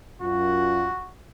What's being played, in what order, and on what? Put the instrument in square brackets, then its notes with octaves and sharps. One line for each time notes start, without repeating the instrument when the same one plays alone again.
[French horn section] F#2 F4 [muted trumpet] F#4